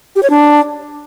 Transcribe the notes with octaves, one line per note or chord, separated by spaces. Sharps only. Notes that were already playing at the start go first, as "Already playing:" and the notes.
G4
C#5
D4